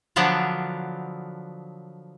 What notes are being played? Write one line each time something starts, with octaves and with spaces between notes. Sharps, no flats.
D3 F3 F#3 B3 D4